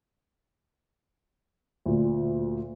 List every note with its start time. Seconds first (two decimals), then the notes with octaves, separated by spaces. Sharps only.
1.86 D2 A#2